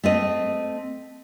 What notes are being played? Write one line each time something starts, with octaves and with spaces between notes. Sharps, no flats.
A3 C4 D#5